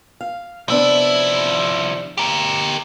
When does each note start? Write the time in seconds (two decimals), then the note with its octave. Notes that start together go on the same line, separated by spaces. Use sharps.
0.21 F5
0.68 C3 F3 B3 D4 E4
2.18 G4 A#4